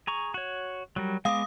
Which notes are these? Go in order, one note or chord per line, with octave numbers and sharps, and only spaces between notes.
G#4 A#5 C#6
F#4 C#5
F#3 G3 A#4
G#3 B3 F5 D6 D#6